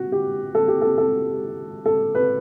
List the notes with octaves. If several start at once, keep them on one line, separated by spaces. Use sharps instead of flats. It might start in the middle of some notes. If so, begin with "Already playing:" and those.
Already playing: F#4
G4
A4
G4
A4
A4
A4
B4